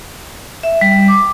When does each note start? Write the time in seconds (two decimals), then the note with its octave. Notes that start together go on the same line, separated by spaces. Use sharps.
0.63 E5
0.81 G3
1.08 D6